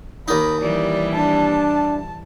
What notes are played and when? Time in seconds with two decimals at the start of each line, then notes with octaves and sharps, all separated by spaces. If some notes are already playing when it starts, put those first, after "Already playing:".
0.28 D#2 D#4 B5
0.61 E3 G3 E4 D5
1.15 D4 A5